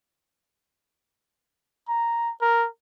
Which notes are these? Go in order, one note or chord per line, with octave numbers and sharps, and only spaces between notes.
A#5
A#4